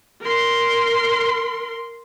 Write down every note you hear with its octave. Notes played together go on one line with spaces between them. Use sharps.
A#4 C6